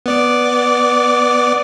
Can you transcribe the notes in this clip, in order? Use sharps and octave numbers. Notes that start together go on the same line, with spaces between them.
B3 D5 D6